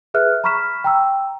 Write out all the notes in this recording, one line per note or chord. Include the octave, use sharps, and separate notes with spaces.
G#4 B4 E5 F6 F#6
A#5 B5 C#6 F6 B6 E7
G5 A#5 E6